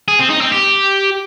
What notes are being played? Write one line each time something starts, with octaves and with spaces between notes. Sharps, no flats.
G#4
C4
D#4
C4
G4